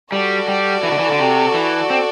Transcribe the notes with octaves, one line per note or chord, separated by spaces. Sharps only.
G3 F#4 A4 D5
G3
E3
D3
E3
D3
C3
E3
C4